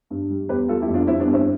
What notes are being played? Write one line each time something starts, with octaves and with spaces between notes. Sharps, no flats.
G2
G3
E2 G4 B4
G3 F4 A4
E4 G4
F2
D4 F4
G3 C4 E4
B3 D4
G2
C4 E4